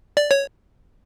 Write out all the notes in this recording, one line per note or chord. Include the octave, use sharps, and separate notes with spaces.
D5
C#5